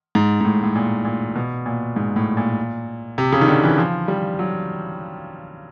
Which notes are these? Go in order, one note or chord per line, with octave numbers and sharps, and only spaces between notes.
G#2
G#2
A2
A2
A#2
A#2
B2
A#2
G#2
A2
A#2
C3
C#3
D#3
D3
E3
F3
G3
F#3